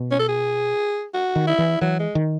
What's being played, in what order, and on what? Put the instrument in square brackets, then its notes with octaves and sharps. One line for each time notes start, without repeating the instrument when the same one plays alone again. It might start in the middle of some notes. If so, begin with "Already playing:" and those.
Already playing: [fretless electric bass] B2
[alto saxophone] C#4
A4
G#4
F#4
[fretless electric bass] D#3
[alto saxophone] E4
[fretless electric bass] E3
[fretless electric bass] E3 [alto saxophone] F#3
[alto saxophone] G#3
[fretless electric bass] D#3